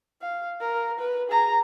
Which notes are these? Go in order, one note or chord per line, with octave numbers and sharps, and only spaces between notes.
F5
A#4
B4
G#4 A#5